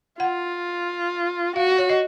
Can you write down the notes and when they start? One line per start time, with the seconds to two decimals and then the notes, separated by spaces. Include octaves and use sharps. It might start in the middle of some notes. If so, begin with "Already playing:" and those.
0.20 F4 F#5
1.56 F#4 F5
1.78 C#5
1.89 D#5